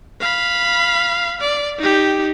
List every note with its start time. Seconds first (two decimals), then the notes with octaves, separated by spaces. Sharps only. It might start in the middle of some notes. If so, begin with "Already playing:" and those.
0.21 F5 B5
1.41 D5
1.79 D#4 G4